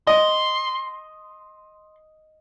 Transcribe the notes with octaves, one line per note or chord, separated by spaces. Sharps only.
D#5 C6